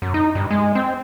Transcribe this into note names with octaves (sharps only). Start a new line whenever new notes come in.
F#2
D#4
G2
G#3
C4